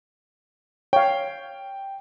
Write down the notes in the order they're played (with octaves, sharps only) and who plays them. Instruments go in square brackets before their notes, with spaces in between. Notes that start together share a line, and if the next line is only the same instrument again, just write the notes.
[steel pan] C#5 F5 [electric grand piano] G5